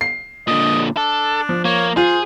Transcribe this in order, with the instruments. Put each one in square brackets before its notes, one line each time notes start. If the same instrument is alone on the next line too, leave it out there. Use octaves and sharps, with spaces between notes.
[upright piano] C7
[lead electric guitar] A#2 D3 [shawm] D#5
[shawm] D4 [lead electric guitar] A4
[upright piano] F3
[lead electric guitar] A#3 [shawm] C#5
[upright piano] F4 [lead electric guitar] G#4 [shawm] C5